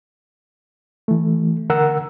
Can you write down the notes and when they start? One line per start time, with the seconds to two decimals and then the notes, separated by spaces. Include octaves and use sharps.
1.08 E3 A3
1.70 D3 A#4 F#5 E6